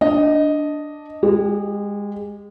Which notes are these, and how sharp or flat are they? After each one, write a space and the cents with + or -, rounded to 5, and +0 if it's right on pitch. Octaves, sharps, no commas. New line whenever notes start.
D4 +0 D#5 +0
G#3 -25 G4 +0